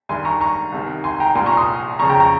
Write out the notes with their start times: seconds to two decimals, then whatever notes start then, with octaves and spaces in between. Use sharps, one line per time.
0.09 G2 D#3 G#5 C6
0.25 A#5 C#6
0.41 A#5 C#6
0.72 C2 C3 D#3
1.04 G#5 C6
1.20 G5 A#5
1.35 C2 A#2 G#5 C6
1.46 A#5 C#6
1.57 C6 D#6
1.99 F2 C#3 A#5 C#6
2.09 G5 A#5
2.20 A#5 C#6